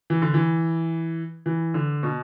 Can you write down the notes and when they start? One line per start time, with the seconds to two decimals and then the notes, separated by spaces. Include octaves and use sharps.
0.10 E3
0.22 D3
0.34 E3
1.46 E3
1.74 D3
2.03 B2